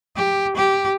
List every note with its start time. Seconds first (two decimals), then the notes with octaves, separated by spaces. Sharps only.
0.16 G4
0.56 G4